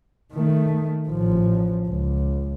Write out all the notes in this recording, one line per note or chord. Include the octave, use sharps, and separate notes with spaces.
D#3 A3
A1 F3
C#2